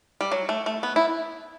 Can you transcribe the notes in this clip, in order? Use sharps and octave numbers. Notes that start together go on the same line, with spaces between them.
G3
F#3
A3
A3
B3
E4